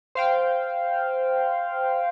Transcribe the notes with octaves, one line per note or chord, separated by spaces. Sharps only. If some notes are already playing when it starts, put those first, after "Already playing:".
C5 F5 G5